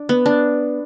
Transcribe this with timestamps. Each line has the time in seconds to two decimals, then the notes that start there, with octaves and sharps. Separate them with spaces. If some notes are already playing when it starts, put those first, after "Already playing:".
Already playing: D4
0.09 B3
0.26 D4